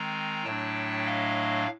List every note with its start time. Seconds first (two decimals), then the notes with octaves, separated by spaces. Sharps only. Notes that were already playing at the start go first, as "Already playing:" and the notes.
Already playing: D#3 G#3 C4 G#5 A#5
0.44 A2 F#3 A3 D4 G5 A5
1.06 D#5 F5